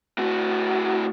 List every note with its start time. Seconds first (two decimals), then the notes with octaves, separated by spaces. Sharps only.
0.18 A2 F#4